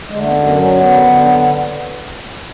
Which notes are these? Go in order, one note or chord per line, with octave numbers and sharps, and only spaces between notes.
D3 G#3
A3
B3
F#2
B3
F#3
C#4
D3 B3
D3